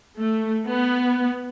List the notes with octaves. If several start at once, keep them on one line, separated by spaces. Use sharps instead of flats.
A3
B3